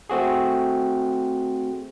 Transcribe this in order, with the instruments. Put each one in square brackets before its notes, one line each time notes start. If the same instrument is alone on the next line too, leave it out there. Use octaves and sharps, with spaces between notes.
[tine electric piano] A3 C4 F#4 G#4